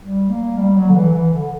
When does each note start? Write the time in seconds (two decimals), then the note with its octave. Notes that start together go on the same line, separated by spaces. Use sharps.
0.02 G3
0.29 A#3
0.57 G3
0.77 F#3
0.89 D3
0.95 E3
1.13 E3
1.33 D3